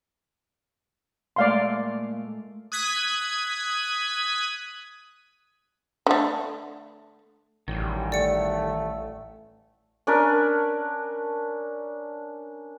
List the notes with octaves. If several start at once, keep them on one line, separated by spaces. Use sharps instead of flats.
A#2 G#3 A3 D5 F5 C6
D#6 F#6 G#6 B6 D#7
D3 A3
A1 D#3 F#3 G3
A3 D5 C#7
C#4 D4 A#4 B4